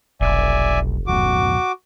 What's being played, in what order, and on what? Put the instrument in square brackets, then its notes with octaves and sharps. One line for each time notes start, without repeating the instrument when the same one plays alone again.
[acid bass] F1 [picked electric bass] B1 [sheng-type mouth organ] D5 E5 G#5
[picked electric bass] D1 F#2 B2 [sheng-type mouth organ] F#4 D6